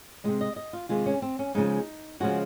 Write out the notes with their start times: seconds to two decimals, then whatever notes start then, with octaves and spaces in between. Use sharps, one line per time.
0.24 D#3 G#3 D#5
0.28 C3
0.41 D#5
0.56 D#5
0.73 F4
0.89 C3 D#3 G#3 F4
1.06 C#4
1.22 C4
1.39 C#4
1.55 C#3 F3 G#3 D#4
2.20 C#3 F3 G#3 F#4